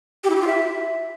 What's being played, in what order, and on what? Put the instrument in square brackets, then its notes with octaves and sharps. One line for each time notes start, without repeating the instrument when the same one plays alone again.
[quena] G4
E4
G4
F4
E5